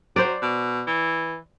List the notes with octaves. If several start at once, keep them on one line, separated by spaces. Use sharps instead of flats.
F#3 C5 D5
B2
E3